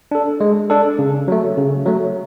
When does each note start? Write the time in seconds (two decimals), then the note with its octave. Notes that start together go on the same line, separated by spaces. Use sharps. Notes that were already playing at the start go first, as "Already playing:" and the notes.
0.11 D4 A4
0.40 G#3
0.70 D4 A4
0.99 C#3
1.28 F#3 A3
1.57 C#3
1.86 F#3 A3